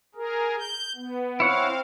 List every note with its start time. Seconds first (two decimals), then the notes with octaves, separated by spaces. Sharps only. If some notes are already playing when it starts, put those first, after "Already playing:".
0.15 G#4 A#4
0.59 G6
0.95 B3
1.40 C4 E4 C#5 F5 F#5